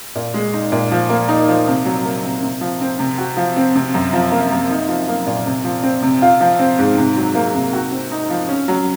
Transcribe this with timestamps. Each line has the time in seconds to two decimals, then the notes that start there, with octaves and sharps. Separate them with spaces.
0.15 A#2
0.34 G#3
0.54 D#4
0.72 A#2
0.91 F3
1.09 A#3
1.29 D#4
1.48 F3
1.67 C3
1.85 F#3
2.05 A#3
2.24 C3
2.42 C3
2.61 F3
2.81 C4
2.99 C3
3.18 F#4
3.37 F3
3.56 C4
3.75 C3
3.94 F#2
4.13 F3
4.31 A#3
4.52 F#2
4.71 D#4
4.89 F3
5.08 A#3
5.27 A#2
5.46 C3
5.64 F3
5.83 C4
6.02 C3
6.22 F4
6.41 F3
6.59 C4
6.79 G#2
6.97 C3
7.17 F#3
7.35 A#3
7.54 C3
7.73 F#4
7.92 C4
8.12 D#4
8.30 F3
8.49 C#4
8.68 F#3